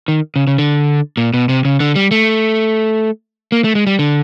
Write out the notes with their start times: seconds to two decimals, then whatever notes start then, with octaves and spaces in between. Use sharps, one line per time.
0.08 D#3
0.36 C#3
0.47 C#3
0.58 D3
1.17 A#2
1.34 B2
1.49 C3
1.65 C#3
1.80 D3
1.96 G3
2.11 A3
3.52 A#3
3.64 A3
3.75 G#3
3.87 G3
3.99 D3